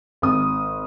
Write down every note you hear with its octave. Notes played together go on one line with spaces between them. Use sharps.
G#1 D#6